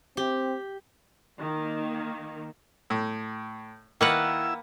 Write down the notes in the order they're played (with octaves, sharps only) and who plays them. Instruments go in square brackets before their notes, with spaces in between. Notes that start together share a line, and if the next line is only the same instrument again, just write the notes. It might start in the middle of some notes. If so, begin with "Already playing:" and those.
[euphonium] C4 [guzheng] G4
[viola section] D#3 A#3
[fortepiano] A2
[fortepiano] D#3 [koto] A#3 B4 F#5 [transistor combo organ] E4 E6